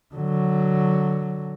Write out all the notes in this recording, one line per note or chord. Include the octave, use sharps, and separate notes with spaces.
D3 F#3